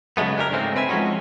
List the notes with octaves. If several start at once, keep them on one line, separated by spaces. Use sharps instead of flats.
C#3 F#3 G#3 A3 B3
D4 G4 A#4
G#2 C#3 G#3 A3 C4
C4 B4 E5 G#5
F3 G#3 A#3 C#4 D#4 F#4